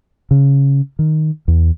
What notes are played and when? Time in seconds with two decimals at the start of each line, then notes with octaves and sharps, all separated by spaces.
0.31 C#3
0.99 D#3
1.48 E2